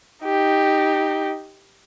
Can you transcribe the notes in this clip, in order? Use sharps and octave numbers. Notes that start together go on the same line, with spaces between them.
D#4 G4